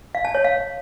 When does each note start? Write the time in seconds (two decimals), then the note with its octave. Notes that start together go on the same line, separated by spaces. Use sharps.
0.15 F5
0.25 A5
0.35 C#5
0.45 F5